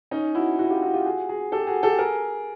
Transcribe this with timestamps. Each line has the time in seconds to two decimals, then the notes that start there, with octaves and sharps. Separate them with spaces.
0.11 C#4 D#4
0.35 E4 F#4
0.59 E4 F#4
0.70 F4 G4
0.82 E4 F#4
0.94 F4 G4
1.05 F#4 G#4
1.29 F#4 G#4
1.52 G4 A4
1.67 F#4 G#4
1.83 G4 A4
1.98 G#4 A#4